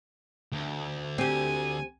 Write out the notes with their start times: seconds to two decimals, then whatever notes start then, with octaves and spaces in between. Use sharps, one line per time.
0.52 D2
1.18 C4 G4 G#5